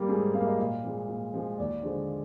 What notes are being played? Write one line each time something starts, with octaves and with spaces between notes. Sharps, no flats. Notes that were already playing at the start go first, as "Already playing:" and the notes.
Already playing: G3 A#3 G4
G#2 G#4
G3 A#3 F5
D#5
A#2 F5
F3 G#3
A#2
F3 G#3
D#2 D5
D3 F3 G#3 C5